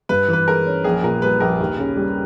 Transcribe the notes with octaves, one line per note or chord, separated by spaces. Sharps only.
G2 B4
E3 B4
G#3 A#4
C#4
A#1 G#4
A#2 A#4
G3 B4
A#1 A#4
D#2
C#3
G3